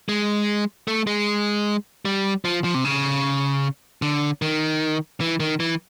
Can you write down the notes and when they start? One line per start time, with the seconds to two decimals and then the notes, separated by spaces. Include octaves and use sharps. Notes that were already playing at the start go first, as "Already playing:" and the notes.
0.09 G#3
0.88 A3
1.07 G#3
2.05 G3
2.45 F3
2.64 F3
2.74 C3
2.85 C#3
4.02 D3
4.42 D#3
5.21 E3
5.40 D#3
5.60 E3